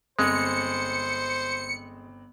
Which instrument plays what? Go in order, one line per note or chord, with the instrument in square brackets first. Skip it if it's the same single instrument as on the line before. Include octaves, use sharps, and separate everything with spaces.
[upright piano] G1 C4 [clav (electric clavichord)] G#3 [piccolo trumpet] C5 [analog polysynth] C#7